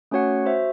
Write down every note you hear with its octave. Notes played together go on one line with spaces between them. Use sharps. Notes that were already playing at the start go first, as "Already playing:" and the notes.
A3 C#4 F#4 C#5 F#5
F#4 C5 E5